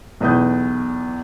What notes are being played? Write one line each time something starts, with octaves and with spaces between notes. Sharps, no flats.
B1 E2 B4 D#6 G6